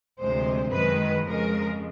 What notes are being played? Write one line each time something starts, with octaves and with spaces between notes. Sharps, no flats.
D2 C3 F3 G#3 C5
F#2 D#3 G#3 B4
F2 C#3 F3 G#3 A#4